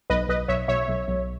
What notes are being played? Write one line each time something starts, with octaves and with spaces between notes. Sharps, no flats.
B1 B4 D#5
B1 B4 D#5
B1 C#5 E5
B1 C#5 E5
B1
B1